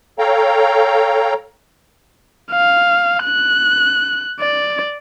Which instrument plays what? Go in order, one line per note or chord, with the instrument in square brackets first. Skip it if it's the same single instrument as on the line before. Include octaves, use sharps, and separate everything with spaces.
[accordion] A4 C#5 F5 G5 A#5
[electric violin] F5
F#6
D5